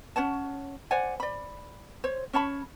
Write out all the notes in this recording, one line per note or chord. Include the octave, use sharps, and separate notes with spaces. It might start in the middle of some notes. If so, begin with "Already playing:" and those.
C#4 C#5 F#5 A5
C5 D5 F#5 G#5
D5 B5
C5 C#5
C#4 C#5 A5 B5